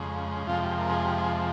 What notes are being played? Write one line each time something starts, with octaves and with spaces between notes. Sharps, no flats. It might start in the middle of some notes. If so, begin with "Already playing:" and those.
Already playing: F2 C#3 G#3
F2 C3 F3 G#3 F4
G4
A#4
G#4
G4
G#4